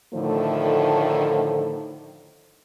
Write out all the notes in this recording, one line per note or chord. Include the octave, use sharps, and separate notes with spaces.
A2 D3 D#3 F3 A3